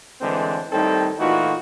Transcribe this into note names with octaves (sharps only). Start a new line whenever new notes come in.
A2 D3 E3 G#3 C4
A2 D#3 G3 C4 D#4 A4
A#2 E3 A3 D#4 F4 F#4